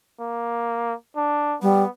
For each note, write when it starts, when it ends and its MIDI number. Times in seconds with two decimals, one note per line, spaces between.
0.20 0.94 58
1.16 1.57 62
1.62 1.83 55
1.62 1.90 59